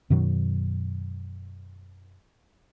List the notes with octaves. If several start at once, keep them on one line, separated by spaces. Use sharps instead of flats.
F#2 B2 D#3 F#3